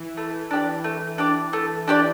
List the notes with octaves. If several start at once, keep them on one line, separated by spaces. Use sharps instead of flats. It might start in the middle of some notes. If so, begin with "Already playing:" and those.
Already playing: E3
A3
D4 G4 D5
A3
D4 G4 D5
A3
D4 G4 D5